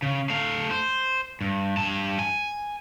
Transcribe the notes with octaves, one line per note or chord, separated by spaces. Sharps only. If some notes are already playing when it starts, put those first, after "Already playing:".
C#3
A3 F5
C5
G2
G2 A5
G#5